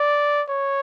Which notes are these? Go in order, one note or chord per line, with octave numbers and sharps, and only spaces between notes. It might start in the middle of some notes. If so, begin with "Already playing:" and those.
Already playing: D5
C#5